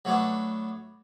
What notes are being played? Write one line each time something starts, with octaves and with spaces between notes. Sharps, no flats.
F#3 A3 B3 D4